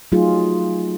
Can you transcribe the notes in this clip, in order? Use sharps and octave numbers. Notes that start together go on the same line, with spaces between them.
F#3 A3 D#4 F4 G#4